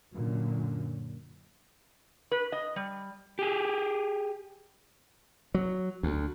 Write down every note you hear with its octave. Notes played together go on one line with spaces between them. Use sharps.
F#2 A#2 D3
B4
D#5
G3
G4 G#4
F#3
D2